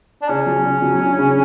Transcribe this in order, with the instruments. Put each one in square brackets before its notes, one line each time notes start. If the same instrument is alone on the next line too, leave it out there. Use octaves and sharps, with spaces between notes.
[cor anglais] D4
[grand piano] C#3 [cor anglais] C#4
[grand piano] F#3
C#3
F#3
D4
C#3